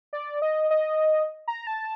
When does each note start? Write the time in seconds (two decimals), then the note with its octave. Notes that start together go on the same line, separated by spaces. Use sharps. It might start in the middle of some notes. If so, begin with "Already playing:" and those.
0.13 D5
0.42 D#5
0.71 D#5
1.48 A#5
1.67 A5